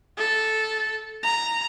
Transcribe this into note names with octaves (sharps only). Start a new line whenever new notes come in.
A4
A#5